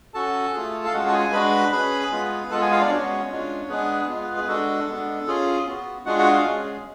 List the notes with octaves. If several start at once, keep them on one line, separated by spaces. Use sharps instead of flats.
C#4 F#4 A4 A5
A3 F4 G#4
F5
G#3 C#4 F4 F#4 G#4 F#5
A5
G#4 G#5
G#3 D4 F#4 B4 B5
C#4 G#4 B4 B5
G#3 B3 F4 G#4
G#3 B3 F4 A4 A5
G#4 G#5
F4 F5
D4 D5
G#3 B3 C#4 F#4 C#5
G#3 D4 F4
G#3 B3 D4 G#4 B4
G#3 B3 F4 G#4
G#4
G#3 D4 F#4 A4
G#3 B3 D4
C#4 F4 G#4
B3 F#4
G#3 D4 F4 F#4 G#4 F#5
F#4 F#5
F4 F5
G#3 C#4 G#4